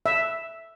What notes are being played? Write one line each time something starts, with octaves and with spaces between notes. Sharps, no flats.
E5